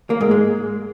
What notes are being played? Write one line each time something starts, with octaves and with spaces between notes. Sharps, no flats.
A#3
G#2
G#3